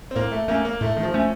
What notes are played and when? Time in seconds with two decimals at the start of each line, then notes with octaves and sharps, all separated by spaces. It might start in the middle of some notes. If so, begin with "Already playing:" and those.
0.11 C4
0.16 A2 A#3
0.32 A3
0.48 A3 A#3 C#4
0.65 A#3
0.81 A2 A3
0.97 D#3
1.03 F3
1.14 A3 C#4